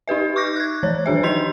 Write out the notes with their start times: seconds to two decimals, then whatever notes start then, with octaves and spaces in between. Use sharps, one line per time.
0.08 D#4 G4 B4 E5
0.36 C#6 D6 G6 A#6
0.56 F#6 G#6
0.83 E3 F3 C#5
1.06 D#3 D4 G#4 E5
1.23 D#4 D#5 C6 G6 F7